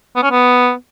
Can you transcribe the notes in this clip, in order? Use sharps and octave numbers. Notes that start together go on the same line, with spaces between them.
B3
C#4
B3